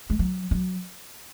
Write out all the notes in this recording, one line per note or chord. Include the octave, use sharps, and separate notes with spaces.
G#3
F#3
F#3